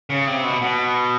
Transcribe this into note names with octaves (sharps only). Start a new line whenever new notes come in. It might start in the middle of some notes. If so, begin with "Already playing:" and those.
C#3
C3
B2
B2